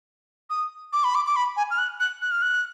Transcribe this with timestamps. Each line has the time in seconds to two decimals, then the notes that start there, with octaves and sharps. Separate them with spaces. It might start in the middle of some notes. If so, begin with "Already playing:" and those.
0.50 D#6
0.93 D6
1.04 B5
1.15 D6
1.27 D6
1.36 B5
1.57 G#5
1.71 F6
1.78 F#6
2.00 F#6
2.22 F#6
2.31 F6
2.42 F#6